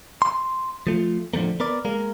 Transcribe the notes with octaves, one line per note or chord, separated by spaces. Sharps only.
C6
F3 A3 F4
A2 D3 F3 A3 A#3
B3 A#4 D5
G#3 A#3 A#4